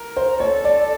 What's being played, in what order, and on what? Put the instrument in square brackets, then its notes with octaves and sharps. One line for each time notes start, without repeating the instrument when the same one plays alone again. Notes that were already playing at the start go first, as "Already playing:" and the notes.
Already playing: [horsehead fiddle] A#4
[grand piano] C5
[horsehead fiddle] A4 [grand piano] C#5
[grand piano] D5